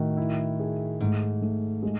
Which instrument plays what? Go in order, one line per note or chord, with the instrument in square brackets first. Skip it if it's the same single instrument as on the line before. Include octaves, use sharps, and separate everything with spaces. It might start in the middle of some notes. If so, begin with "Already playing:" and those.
Already playing: [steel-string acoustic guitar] A2 [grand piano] D#3 F#4
[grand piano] E4
G#4
[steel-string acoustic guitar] G#2 [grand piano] A3
[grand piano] A3
G#3